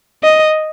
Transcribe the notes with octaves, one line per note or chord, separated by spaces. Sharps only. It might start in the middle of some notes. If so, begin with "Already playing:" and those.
D#5